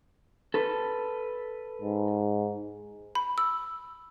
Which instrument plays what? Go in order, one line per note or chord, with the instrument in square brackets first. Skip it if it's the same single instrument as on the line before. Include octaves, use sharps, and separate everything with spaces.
[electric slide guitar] A4 B4
[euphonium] G#2
[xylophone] B5
E6